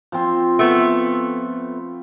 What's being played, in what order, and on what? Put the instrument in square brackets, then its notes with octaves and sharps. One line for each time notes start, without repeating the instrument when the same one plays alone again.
[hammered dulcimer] F3 C4
[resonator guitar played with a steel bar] A3 B3